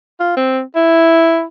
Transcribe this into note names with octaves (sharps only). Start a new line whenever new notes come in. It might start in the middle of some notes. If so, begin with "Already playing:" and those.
F4
C4
E4